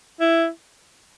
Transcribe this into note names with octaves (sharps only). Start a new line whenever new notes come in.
E4